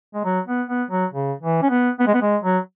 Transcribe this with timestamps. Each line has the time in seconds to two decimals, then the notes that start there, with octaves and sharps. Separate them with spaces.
0.15 G#3
0.25 F#3
0.48 B3
0.68 B3
0.91 F#3
1.13 C#3
1.42 E3
1.62 C#4
1.70 B3
2.00 B3
2.07 G#3
2.14 B3
2.22 G#3
2.44 F#3